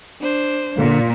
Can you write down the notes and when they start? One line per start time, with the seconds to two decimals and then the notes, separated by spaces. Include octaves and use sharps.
0.22 D4 C5
0.78 A#2 D3